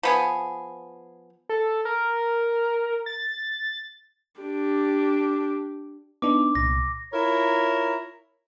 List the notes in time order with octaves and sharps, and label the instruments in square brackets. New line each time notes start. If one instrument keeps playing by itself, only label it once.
[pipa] F3 B3 G#4
[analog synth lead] A4
A#4
A6
[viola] D4 G4
[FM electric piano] B3 D4 D#4 [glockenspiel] D6
[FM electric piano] C2 A#2 [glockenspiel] A#6
[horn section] E4 F4 A#4 C#5 A#5